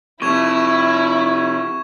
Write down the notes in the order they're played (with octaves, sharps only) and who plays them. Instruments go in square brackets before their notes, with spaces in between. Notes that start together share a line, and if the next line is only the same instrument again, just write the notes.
[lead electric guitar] C3 F3 [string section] E4 [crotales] C#6 G#6 E7